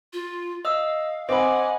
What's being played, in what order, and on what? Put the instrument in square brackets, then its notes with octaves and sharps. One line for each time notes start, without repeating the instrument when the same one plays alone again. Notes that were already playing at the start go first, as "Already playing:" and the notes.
[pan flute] F4
[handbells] D#5 E6 [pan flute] F5
[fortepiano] C4 [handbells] D#5 B5 [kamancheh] F#5 G#5 [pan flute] D6